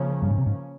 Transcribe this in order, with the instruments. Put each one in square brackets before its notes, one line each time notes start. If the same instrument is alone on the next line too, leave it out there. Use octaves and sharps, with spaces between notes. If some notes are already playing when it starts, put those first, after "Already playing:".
Already playing: [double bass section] C#3 F3 A#3 C#4
[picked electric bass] G2
G#2
C3
G#2